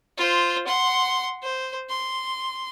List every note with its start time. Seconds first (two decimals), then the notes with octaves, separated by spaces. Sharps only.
0.18 F4 C5
0.67 F#5 C6
1.43 C5
1.89 C6